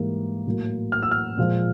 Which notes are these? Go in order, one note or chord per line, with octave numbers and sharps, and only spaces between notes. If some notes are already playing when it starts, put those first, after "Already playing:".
Already playing: G#2 E3 G3 A#3
A2 F#3 A#3
F6
E6
F6
A#2 F3 G#3